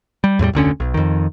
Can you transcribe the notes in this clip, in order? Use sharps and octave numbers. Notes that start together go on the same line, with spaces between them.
G3
E2 A2 F3 G3
F1 D2 D3 C#4
B1
F2 D#3